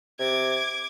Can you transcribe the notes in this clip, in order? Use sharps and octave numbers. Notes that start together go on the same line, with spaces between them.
C3 D6 G#6